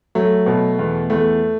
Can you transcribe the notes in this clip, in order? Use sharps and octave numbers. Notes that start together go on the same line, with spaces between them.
F#3 A3
B2
E2
E2 A3